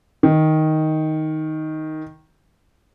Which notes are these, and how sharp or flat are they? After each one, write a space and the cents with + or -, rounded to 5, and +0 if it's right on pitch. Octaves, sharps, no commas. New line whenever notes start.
D#3 +5